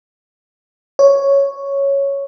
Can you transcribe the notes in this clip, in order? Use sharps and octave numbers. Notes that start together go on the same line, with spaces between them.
C#5